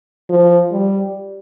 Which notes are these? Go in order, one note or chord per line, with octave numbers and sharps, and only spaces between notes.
F3
G3